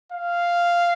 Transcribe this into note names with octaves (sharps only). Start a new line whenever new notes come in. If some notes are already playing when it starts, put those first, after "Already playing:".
F5